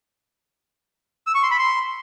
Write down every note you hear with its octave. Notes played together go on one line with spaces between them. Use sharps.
E6
C#6
C6
B5
C6